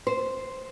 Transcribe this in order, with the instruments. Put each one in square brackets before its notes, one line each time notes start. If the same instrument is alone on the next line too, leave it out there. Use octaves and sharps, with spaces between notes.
[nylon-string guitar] C5